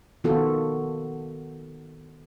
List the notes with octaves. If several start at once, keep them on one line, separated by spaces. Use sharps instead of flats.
D#3 B3 F4 F#4 A4